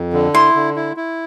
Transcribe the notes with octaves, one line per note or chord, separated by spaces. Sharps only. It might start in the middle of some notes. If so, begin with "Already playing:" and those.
Already playing: F2
D3
E4 C6
D3
E4
E4